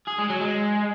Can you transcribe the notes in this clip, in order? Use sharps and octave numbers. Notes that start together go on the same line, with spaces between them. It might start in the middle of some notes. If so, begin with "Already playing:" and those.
G#4
G#3
F#3
G#3